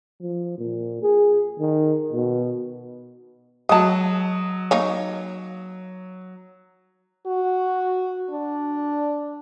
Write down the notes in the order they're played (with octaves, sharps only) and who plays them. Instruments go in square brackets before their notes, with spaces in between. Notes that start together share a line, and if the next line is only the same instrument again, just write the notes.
[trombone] F3
A#2
G#4
D#3
B2
[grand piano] F#3 D#6 [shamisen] G#3 A5
[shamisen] A#3 D#4 C#5
[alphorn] F#4
D4